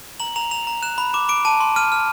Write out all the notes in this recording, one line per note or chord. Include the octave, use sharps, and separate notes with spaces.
A#5 F#7
A#5 F7
A#5 F7
A#5
F#6 E7
B5
D6 E7
D6 D7
A5 D#7
C6
F6 D#7
F6